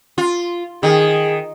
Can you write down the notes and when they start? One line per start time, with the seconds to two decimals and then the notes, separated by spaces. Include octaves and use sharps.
0.18 F4
0.83 D#3 G#4